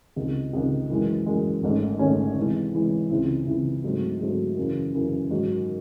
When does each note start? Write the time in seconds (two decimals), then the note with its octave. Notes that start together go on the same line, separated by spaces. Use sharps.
0.16 C#2 C3 D#3
0.53 C#2 C3 D#3
0.90 F#2 E3 G#3
1.26 F#2 E3 G#3
1.63 G#1 G#2 D#3 A3 C#4
1.99 G#1 G#2 D#3 A3 C#4
2.37 C3 E3 G#3
2.74 C3 E3 G#3
3.10 C#2 C3 E3 C4 E4
3.47 C#2 C3 E3 C4 E4
3.84 G#2 F#3 A3 C4
4.21 G#2 F#3 A3 C4
4.57 F#2 C#3 E3
4.94 F#2 C#3 E3
5.31 G#2 D#3 F#3